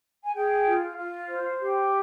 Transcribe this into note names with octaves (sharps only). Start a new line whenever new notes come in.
G#5
G#4 G5
F4
F4
C5
G4